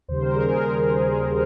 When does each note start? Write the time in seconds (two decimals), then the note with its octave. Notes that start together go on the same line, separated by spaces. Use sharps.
0.08 D#2 C#3 G3 C5
0.22 A#4
0.35 G#4
0.48 A#4
0.89 G#4